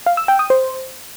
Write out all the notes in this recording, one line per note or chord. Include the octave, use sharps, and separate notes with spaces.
F5
E6
G5
D#6
C5